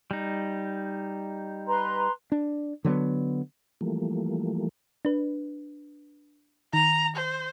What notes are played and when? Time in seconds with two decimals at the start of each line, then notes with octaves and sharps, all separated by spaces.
0.11 G3 D#4
1.66 B4 A#5 C6
2.32 D4
2.85 D3 F#3 A3 B3
3.81 E3 F3 G3 A3 A#3
5.05 D4 B4
6.73 D#3 A#5
7.16 C5